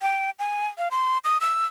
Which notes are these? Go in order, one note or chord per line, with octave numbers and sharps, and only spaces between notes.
G5
G#5
F5
C6
D#6
E6